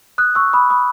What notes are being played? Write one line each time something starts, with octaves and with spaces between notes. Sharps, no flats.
D#6 F#6
C#6 E6
B5 D#6
B5 D#6